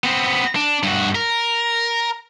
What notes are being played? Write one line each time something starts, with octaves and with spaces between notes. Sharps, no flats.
B3 C4
D4
G2 F#4
A#4